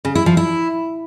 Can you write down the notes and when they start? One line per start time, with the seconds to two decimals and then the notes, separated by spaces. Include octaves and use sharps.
0.05 C#3
0.15 E4
0.26 F3
0.37 E4